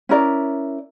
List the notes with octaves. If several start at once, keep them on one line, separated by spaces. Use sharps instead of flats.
C#4 E4 A#4 D5